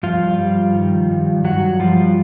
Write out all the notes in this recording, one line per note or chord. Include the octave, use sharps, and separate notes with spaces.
G2 F3 F4
G3
D#3
G2
G2 F#3 F#4
F3 G3 F4